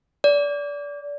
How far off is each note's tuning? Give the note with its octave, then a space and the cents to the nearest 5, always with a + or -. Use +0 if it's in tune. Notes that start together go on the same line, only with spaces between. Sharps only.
D5 -25